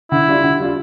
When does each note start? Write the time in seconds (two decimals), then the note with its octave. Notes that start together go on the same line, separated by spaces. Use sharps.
0.11 D3 E4
0.28 G3 D4 F4
0.44 D3
0.60 G3 D4 F4